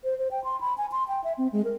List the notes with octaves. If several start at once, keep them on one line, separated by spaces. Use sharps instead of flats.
C5
C5
G5
C6
B5
G#5
C6
G5
E5
C4
G#3
A#4